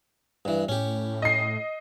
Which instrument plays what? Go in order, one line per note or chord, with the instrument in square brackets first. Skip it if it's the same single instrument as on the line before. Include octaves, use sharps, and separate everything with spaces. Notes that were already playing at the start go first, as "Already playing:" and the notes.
[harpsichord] G2 E3
[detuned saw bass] A2 [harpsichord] C#4 G4
[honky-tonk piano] D#5 C7